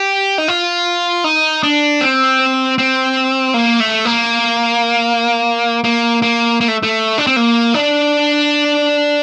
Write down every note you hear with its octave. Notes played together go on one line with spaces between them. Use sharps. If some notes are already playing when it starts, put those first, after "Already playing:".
Already playing: G4
D#4
F4
D#4
D4
C4
C4
A#3
A3
A#3
A#3
A#3
A#3
A3
A3
D4
C4
A#3
D4